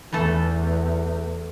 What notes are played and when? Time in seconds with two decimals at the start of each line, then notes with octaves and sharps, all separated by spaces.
0.13 E2 E3 A3 A4